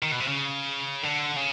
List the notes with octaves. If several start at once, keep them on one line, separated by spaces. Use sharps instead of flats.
D#3
B2
C3
C#3
D3
C#3